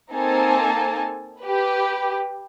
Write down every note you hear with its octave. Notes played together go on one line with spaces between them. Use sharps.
A#3 C4 D#4 A4 G#5 A5
G4 B4